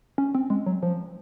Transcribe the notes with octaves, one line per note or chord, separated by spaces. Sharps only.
C#4
C4
G#3
F#3
F3